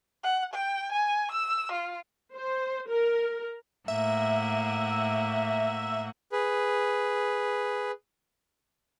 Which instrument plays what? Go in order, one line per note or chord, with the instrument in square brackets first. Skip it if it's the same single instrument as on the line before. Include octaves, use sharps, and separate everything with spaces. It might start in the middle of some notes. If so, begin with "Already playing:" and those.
[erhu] F#5
G5
G#5
E6
F4
[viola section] C5
A#4
[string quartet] A2 A#3 F#5 [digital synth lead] E5
[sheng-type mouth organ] G#4 B4